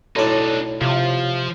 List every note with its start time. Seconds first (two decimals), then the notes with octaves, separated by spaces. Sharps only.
0.16 B1 A2 D4 D#4 A4 D5
0.82 C3 F3 F4